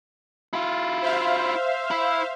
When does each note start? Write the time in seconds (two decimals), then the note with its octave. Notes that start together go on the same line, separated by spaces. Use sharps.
0.53 E4 F4
1.02 C5 E5 F5
1.91 E4